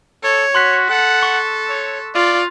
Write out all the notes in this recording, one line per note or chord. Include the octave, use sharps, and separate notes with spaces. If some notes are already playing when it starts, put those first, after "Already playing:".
A4 C#5
F#4 C6 F#6 B6
A4 F#5
C#6
C#5
F4 D5